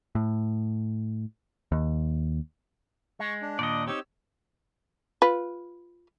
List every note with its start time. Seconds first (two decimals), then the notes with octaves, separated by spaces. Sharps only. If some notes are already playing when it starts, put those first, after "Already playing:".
0.15 A2
1.72 D#2
3.20 G#3 C#6
3.42 D4
3.59 D#2 A#2 D5 D#5
3.87 C4 D#4 G4 C#5 E6
5.22 F4 B4